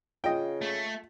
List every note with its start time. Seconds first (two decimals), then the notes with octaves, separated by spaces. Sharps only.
0.24 C#3 F4 D#5 G5
0.62 A3